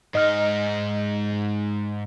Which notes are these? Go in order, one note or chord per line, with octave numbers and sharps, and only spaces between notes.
G#2 D#4 D#5 F6